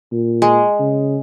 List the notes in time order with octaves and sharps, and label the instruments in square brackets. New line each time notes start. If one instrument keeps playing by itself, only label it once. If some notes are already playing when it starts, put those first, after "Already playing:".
[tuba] A#2
[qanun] G#3
[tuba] C#3